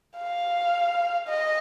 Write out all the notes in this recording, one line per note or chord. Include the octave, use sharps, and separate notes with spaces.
F5
D#5